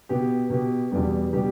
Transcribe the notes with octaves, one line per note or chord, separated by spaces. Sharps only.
B2 B3 G4
B2 B3 G4
E2 B2 G3 B3 G4
B2 G3 B3 G4